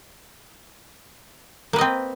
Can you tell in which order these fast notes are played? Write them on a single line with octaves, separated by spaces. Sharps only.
A#3 B4 D#5 C4